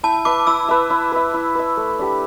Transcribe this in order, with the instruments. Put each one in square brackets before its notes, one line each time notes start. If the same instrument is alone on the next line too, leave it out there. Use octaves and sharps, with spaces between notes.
[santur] E4 [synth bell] A5
[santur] B4 E5 [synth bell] D6
[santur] E4 [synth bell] E6
[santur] B4 E5
E4
B4 E5
E4
B4 E5
A3
D4 G4